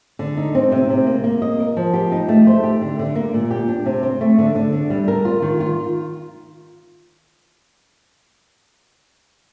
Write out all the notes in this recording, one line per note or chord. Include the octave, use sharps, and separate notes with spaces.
D3
D#4
C4
C3
C3
A#3
A#3
D#5
A#4
F3
G4
D#4
A3
C5
G4
D3
D3
A#3
A#2
G4
D4
C3
C4
A3
D3
D3
D4
G3
A#4
F4
D#3
F4